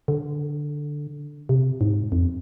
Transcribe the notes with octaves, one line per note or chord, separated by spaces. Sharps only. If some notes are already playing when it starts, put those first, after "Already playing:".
D3
C3
G#2
F2